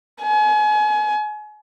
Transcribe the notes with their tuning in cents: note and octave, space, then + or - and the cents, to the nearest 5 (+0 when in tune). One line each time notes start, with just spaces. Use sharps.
G#5 +35